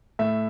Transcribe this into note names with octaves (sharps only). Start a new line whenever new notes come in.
A2 E5